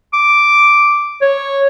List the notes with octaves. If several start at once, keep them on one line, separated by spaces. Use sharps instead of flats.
D6
C#5